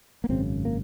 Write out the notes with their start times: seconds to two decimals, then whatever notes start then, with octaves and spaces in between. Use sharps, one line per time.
0.24 A#3
0.29 G#1 F#2 C#3 C4
0.65 A#3